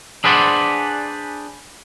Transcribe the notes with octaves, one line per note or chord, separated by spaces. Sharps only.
D4 G#4 B4 C5 D5 F#5